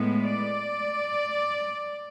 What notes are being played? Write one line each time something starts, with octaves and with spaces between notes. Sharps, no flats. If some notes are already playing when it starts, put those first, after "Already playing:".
Already playing: A2 G#3 B3
D5